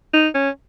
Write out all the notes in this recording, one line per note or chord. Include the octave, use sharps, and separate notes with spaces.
D#4
C#4